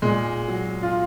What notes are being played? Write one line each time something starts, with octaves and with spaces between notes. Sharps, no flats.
A#2 G#3
F#3
F4